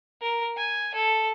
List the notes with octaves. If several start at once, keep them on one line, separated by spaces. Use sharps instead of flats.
A#4
G#5
A4